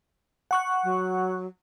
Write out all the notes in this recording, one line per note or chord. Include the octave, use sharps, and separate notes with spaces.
F#5 C#6 F#6
F#3